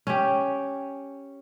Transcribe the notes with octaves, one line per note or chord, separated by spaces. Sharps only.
C#4 G4